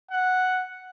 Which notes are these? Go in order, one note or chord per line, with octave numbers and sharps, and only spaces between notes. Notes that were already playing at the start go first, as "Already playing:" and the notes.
F#5